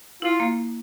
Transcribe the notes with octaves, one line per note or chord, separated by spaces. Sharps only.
E4 F4
A#3